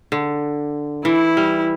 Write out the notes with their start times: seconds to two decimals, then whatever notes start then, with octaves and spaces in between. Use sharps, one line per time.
0.12 D3
1.05 E3 E4
1.37 G3